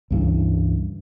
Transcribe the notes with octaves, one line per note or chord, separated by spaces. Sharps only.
C#2 G2 E3